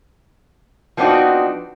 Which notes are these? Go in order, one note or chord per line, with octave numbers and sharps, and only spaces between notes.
F3 B3 C4 D4 D#4 F#4